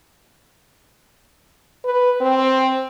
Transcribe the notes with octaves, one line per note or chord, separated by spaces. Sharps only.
B4
C4